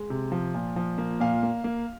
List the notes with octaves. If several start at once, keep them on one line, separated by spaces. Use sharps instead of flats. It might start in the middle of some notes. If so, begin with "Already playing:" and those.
Already playing: G#3
C3
F3
A#2
F3
A#3
A#2 F5
A#3
A#3